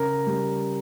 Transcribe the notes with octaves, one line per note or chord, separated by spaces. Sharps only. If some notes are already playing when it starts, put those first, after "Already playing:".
Already playing: C#3 A#4
G3